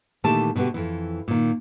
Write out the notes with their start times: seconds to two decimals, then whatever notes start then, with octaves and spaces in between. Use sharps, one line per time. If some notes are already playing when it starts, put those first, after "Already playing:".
0.24 A#2 D#3 E3 A3 G4 A5
0.56 B2 D3 A3 B3 G4
0.74 F2 E3
1.28 A#2 D#3